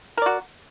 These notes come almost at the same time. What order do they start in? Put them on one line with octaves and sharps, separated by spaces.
A#4 D5 F#4